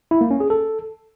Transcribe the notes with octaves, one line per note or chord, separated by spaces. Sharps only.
E4
A#3
C#4
G#4
A4